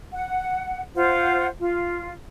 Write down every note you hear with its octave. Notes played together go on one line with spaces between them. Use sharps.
F#5
F4 C5 F#5
F4